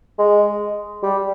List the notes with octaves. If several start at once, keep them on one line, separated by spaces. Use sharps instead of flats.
G#3
G3